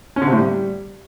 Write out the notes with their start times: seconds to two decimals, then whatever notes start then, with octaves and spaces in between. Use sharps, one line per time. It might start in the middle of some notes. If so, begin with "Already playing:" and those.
0.16 C#4
0.22 D3
0.27 C3
0.32 A2
0.38 G3